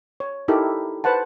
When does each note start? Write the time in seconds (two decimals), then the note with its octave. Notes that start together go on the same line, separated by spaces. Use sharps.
0.20 C#5
0.48 D#4 E4 G4 A4 A#4
1.04 B4 C5 F#5 A5